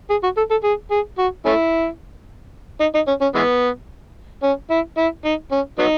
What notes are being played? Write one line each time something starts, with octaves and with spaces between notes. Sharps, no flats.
G#4
F#4
A4
A4
G#4
G#4
F#4
A3 C#4 E4
D#4
D#4
C#4
C#4
E3 G#3 B3
C#4
E4
E4
D#4
C#4
F#3 B3 D#4